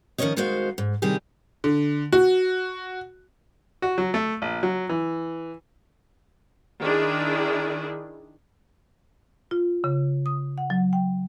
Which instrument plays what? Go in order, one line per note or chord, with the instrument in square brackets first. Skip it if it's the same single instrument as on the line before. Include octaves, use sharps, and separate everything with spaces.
[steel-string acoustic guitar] D#3 F3 C4 C#4 C#5 D#5
F2 D#3 G#3 F#4 C5 F5
G#2
C3 D#3 G3 E4 G4 G#4
[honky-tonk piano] D3
F#4
[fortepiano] F#4
F#3
A3
A#1
F#3
E3
[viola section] D#3 D4 E4 G#4
[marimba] F4
C#3
D#6
F#5
F#3
G5